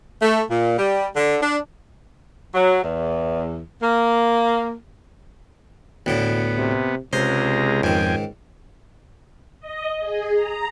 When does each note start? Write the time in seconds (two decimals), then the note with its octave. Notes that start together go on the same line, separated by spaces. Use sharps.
0.22 A3
0.50 A#2
0.79 G3
1.16 D3
1.43 D4
2.55 F#3
2.83 E2
3.83 A#3
6.06 E1 D2 A2 D3 B3
6.57 C3
7.13 C#2 C3 G#3 C5 A#5
7.84 F2 G#2 D#3 G5 G#5
9.60 D#5
10.00 G#4
10.34 A#5